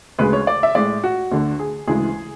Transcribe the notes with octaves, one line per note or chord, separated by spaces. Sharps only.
D2 C#3 G#3 B4
C#5
D5
E5
A2 G#3 D5
F#4
D2 D3 A3
G#4
D2 C#3 E3 G#3 G#4